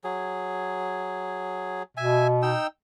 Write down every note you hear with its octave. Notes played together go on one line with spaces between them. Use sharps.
F#3 G#4
B2 E5 G#5
D#4 G5 E6